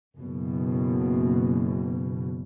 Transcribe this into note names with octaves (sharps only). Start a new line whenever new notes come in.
F#1 B2